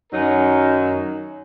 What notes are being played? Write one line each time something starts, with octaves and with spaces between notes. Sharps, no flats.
F#2 D#3 F#3 D#4 A#4